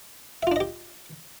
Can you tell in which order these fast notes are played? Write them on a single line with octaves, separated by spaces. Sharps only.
E5 F4 D4 D#5 G4